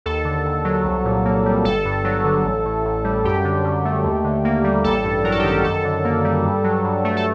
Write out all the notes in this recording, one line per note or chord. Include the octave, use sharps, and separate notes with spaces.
D#2 A4
D3
D#2
F#3
C2
A#2
A#3
G3
G1 A4
G2
F#3
D3
A1
A2
A1
G3
F#2 G4
D3
F#2
A3
D#2
D3
A#3
G3
A1 A4
G2
F#3 A#4
A4
G4
D#3 A4
F#2 A4
D3
A#3
G3
G2
F#3
G2
A3
A4